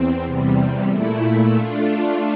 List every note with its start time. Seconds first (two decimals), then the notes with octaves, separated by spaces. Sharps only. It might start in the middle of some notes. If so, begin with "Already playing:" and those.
Already playing: E2 C4
0.23 E2 C3 G3
0.90 A#2 A3 E4
1.56 A3 D4 F4